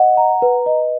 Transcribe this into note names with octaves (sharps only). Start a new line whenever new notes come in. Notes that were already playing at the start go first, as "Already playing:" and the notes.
Already playing: D#5 F#5
A#5
B4
D#5